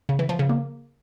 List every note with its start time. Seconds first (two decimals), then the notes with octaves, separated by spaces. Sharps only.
0.09 C#3
0.19 E3
0.29 F3
0.39 C#3
0.49 A#3